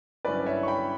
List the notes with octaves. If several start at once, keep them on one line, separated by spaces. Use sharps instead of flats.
G2 D3 F#3 C#4 E4 B4 D5
C#5 E5
C#6
G5 B5